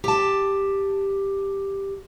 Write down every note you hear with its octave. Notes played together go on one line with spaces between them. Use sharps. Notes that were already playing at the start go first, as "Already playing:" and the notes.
G4 A5